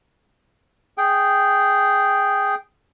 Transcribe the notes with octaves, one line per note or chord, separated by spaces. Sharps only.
G#4 G5